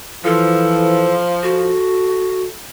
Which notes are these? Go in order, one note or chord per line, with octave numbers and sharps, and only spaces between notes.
E3 F3 A4
F#4 A4